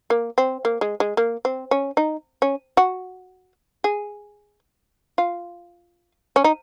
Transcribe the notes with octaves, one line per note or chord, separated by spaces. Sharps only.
A#3
C4
A#3
G#3
G#3
A#3
C4
C#4
D#4
C#4
F#4
G#4
F4
C#4
D#4